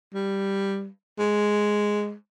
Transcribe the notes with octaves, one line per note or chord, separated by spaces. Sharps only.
G3
G#3